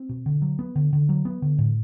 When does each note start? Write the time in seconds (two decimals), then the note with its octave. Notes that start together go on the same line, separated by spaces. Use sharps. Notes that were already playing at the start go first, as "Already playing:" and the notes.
Already playing: C4
0.09 B2
0.26 D3
0.42 F#3
0.59 B3
0.76 D3
0.93 D3
1.09 F#3
1.25 B3
1.42 D3
1.58 A2